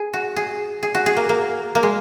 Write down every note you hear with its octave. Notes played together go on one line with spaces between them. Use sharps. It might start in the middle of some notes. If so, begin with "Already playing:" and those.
Already playing: G#4
F#4
G#4
G#4
F#4
G#4
A#3
A#3
A#3
G#3